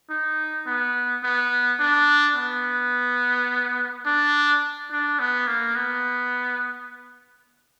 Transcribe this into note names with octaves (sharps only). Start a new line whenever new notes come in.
D#4
B3
B3
D4
B3
D4
D4
B3
A#3
B3